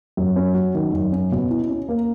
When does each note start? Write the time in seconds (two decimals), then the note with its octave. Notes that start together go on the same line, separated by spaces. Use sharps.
0.17 F#2
0.36 C#4
0.54 F#3
0.75 D#3
0.93 F#2
1.12 C#4
1.32 B2
1.50 E4
1.69 C#4
1.89 A#3